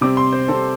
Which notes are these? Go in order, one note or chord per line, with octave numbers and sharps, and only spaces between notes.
C3 G3 C4 D6
C6
C5
C3 G3 C4 A4